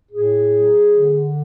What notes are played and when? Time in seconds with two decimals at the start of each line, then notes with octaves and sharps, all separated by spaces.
0.11 A2 G#4
0.52 F#3
0.93 D3